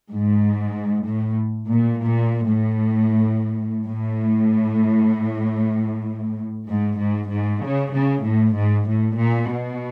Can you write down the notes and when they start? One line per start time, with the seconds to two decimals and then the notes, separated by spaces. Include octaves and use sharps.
0.12 G#2
1.05 A2
1.68 A#2
1.99 A#2
2.46 A2
3.86 A2
6.67 G#2
7.00 G#2
7.30 G#2
7.62 C#3
7.93 C#3
8.25 A2
8.56 G#2
8.87 A2
9.18 A#2
9.50 B2